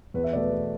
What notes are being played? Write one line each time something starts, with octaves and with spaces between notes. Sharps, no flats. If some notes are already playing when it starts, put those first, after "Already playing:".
E2 B4
E5
B2 A3 D5
B4
E2